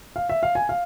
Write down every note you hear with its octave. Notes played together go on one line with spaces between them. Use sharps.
F5
E5
F5
G#5
F5